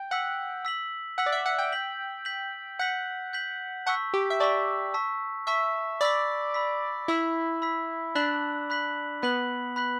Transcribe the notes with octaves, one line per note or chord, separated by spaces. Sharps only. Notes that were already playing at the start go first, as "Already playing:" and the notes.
Already playing: G5
F#5 E6 B6 F#7
E6 B6 F#7
F#5 E6 B6 F#7
D5
E5
F#5
G5
G6 B6 F#7
G6 B6 F#7
F#5 G6 B6 F#7
G6 B6 F#7
F#5 A5 C#6 E6 B6
G4
E5
D5 A5 C#6 E6 B6
A5 C#6 E6 B6
E5 A5 C#6 E6 B6
D5 B5 E6 B6
B5 E6 B6
E4 B5 E6 B6
B5 E6 B6
D4 B5 F#6 B6 F#7
B5 F#6 B6 F#7
B3 B5 F#6 B6 F#7
B5 F#6 B6 F#7